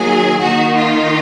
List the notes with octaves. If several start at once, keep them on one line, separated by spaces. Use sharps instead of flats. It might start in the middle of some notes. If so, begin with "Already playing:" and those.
Already playing: D#3 F#3 A#3 G#4
D#3 A#3 D#4 F#4
F4